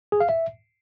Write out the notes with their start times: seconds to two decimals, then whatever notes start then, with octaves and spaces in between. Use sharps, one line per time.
0.12 G#4
0.20 F5
0.29 E5